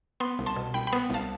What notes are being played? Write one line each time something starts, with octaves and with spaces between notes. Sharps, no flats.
B3 C6
C2
A5 C6
B2
C2 G5 B5
G5 B5
B3
C2 F5 A5